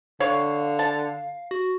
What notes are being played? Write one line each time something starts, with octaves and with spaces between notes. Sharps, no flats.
D3 C#5 F5
A5
F#4